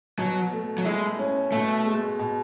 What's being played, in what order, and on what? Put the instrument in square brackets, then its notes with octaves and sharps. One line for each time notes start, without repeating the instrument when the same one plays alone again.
[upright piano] B2 [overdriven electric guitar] F#3
[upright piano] A3
[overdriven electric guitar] F#3
[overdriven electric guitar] G#3 [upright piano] E4
[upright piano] C#4
[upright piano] B2 [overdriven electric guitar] A3
[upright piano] G#3
B2